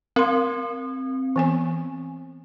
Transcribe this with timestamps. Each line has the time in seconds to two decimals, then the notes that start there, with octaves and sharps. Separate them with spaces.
0.16 C4 A#4 C6
1.36 E3 B3 G#5